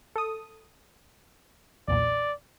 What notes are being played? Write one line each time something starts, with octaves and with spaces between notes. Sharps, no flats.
A4 D#6
B1 E2 A#2 D5